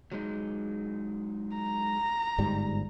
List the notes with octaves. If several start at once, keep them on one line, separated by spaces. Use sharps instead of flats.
F#3 G#3 D#4
A#5
G1 G#2 G3